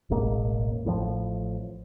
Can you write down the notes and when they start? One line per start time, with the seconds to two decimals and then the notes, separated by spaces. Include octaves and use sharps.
0.10 E1 A1 G#3 A#3
0.85 A1 A2 C3 F3